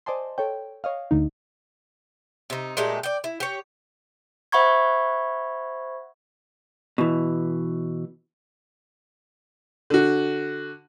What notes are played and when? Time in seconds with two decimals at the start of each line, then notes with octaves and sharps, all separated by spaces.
0.06 C5 D5 D#5 G#5 A5 C6
0.38 A4 C#5 G5
0.84 C#5 D#5 F5
1.11 D2 D3 D#4
2.50 C3 D#4
2.77 A#2 G#3 A3 G4
3.03 D5 G5
3.24 E4
3.40 G4 C#5
4.52 C5 E5 F#5 B5 C#6 G#6
6.98 B2 E3
9.90 D3 F#4